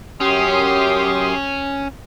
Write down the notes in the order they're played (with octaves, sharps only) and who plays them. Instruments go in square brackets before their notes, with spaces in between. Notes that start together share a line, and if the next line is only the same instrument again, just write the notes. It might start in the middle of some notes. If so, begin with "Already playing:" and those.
[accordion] F#2 C6 D#6 [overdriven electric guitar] C#4 [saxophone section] G4